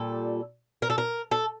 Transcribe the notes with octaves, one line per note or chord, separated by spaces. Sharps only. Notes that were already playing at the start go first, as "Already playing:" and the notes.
Already playing: A#2 G3 A4
A#4
A4
A#4
A4